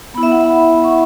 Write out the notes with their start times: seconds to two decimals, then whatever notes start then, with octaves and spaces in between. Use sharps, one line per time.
0.14 B3 B5
0.18 E4
0.23 E5
0.32 F#5
0.41 B5
0.84 C#6